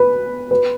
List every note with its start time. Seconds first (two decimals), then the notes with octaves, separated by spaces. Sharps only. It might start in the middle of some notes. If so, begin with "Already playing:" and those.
Already playing: B4
0.51 B4